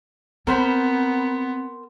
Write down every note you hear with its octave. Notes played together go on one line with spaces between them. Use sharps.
B3 C4 A#4 C5 B5